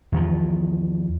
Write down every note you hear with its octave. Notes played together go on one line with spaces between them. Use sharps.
E2 D#3 F3